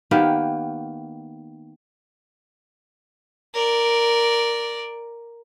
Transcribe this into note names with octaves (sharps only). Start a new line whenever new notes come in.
D#3 A#3 B3 G4
A#4 D5